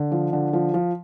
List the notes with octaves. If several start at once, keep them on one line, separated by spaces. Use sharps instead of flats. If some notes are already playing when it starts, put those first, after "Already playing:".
Already playing: D3
F3
D3
F3
F3